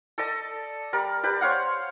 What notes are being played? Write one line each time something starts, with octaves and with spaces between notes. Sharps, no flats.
A4 D5 D#5 A5
G3 A#4 D5
G4 B4 D5
C5 C#5 F5 F#5